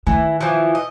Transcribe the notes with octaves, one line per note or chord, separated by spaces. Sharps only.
D#3 E3
E3 F3
D#5